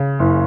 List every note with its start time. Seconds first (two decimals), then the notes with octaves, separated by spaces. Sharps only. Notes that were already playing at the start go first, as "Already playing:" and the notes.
Already playing: C#3
0.19 F#1